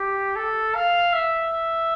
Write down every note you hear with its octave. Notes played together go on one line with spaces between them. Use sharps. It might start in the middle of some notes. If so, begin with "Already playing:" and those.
Already playing: G4
A4
F5
E5